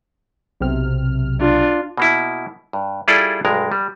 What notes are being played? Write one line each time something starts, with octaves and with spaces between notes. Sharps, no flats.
B1 C3 F6
D4 F4
B2 A#3 E4
G2
G3 E4 F4 G#4 A4 D5
B1 G2 G#3 A#4
G3